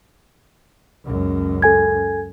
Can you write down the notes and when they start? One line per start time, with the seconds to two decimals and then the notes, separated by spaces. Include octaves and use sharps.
1.05 C#2 F#2
1.62 A4 G#5 G#6